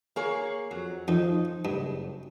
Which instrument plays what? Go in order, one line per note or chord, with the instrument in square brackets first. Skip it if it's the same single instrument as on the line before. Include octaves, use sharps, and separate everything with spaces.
[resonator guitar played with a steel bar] A#3 G#4 C#5
[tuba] F2 [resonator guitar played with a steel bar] F#3
[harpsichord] F2 [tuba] F3 [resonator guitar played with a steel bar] D#4
[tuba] F#1 [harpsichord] G2